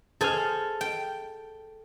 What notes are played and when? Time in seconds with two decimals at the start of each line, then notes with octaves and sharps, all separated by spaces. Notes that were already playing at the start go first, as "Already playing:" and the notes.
0.21 G#4 A4 C5 G#5 F6
0.81 G5